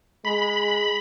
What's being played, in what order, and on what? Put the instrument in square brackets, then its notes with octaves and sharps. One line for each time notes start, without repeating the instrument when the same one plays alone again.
[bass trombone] G#3 [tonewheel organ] B5